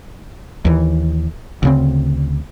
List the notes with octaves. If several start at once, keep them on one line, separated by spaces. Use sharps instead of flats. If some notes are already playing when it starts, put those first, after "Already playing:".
D#2 E3
D2 C#3 C4